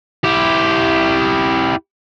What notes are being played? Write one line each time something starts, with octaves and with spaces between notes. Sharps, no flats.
E4 G4